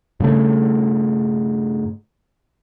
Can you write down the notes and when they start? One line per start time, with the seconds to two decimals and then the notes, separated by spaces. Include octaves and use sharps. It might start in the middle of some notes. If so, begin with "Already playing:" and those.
0.20 G2 C#3 A3